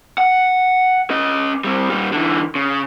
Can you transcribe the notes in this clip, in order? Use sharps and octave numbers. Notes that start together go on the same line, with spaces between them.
F#5
C#4 D#5
G3 C4
A#2 G3
D3 E3
C#3